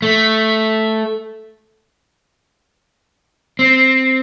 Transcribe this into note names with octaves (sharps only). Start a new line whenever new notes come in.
A3
C4